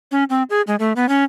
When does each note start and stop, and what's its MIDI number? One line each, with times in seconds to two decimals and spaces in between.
0.11 0.24 61
0.30 0.43 60
0.50 0.62 68
0.67 0.76 56
0.79 0.93 57
0.96 1.08 59
1.09 1.24 61